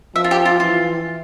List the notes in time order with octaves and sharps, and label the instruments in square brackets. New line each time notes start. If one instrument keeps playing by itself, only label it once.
[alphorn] F3 [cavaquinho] E5
[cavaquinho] F4
G4
F4
[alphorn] E3 [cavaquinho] F4